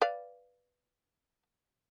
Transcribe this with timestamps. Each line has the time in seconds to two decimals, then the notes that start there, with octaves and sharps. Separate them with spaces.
0.02 B4 D5 F5